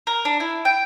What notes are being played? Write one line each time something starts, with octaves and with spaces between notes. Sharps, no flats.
A#4
D4
E4
G5